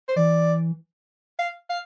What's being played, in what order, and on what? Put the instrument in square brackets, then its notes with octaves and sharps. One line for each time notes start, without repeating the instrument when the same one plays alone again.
[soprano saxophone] C5
[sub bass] E3 [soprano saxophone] D5
[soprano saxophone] F5
F5